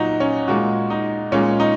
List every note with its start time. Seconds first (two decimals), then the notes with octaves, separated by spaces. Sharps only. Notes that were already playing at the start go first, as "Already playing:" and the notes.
Already playing: A#2 F#3 D#4 F#4
0.20 C#4
0.48 A#2 G#3 F#4
0.90 D#4
1.32 A#2 G#3 C#4
1.60 D#4